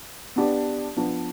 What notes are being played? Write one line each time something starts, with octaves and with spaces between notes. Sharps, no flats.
B3 D4 G4 D5
F3 B3 D4